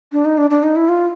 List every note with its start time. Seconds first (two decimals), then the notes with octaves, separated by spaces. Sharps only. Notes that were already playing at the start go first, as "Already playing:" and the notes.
0.12 D4
0.25 D#4
0.38 D4
0.50 D4
0.63 D#4
0.76 E4
0.89 F4